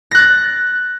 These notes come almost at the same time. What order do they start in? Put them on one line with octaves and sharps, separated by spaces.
A#6 F#6 A6